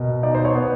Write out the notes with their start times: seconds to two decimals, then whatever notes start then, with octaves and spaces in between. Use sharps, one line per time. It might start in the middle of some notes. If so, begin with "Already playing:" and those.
Already playing: B2 A#4
0.23 D#4 D5
0.35 C5
0.45 C#5
0.55 B3